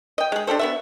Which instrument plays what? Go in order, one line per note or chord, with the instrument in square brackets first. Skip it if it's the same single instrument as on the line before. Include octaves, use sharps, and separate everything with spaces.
[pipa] D#5 G5
G#3 G#4
D4 G4 A4 C5
B3 F#4 E5